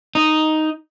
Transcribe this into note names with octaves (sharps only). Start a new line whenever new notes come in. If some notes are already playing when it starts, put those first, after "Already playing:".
D#4